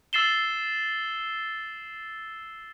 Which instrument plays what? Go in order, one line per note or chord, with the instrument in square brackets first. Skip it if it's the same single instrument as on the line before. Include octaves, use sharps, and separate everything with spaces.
[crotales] E6 A6 C7 E7 G7